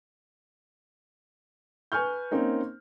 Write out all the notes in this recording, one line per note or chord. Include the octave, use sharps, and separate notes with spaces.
B4 G#5 C#6 F6 G6
A#3 C4 C#4 D#4 A#4